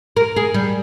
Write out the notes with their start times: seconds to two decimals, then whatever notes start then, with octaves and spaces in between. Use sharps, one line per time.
0.17 A#4
0.36 G#4
0.54 G3